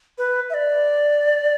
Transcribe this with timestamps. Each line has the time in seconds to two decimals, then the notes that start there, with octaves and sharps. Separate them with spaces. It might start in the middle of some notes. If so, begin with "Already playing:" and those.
0.18 B4
0.50 E5
0.54 D5